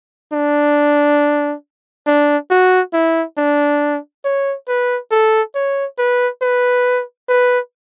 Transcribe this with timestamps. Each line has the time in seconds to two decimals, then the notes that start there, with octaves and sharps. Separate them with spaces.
0.33 D4
2.07 D4
2.50 F#4
2.94 E4
3.38 D4
4.25 C#5
4.68 B4
5.11 A4
5.55 C#5
5.98 B4
6.42 B4
7.29 B4